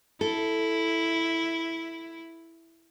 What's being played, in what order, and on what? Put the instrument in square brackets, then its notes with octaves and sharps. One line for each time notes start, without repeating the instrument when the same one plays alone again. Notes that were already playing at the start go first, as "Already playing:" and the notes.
[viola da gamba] E4 [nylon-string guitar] A4